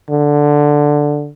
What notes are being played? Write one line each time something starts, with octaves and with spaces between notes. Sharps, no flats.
D3